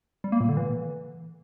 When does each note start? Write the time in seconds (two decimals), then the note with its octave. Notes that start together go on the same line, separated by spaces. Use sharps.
0.24 G3
0.32 A#3
0.40 A#2
0.49 D3
0.57 E3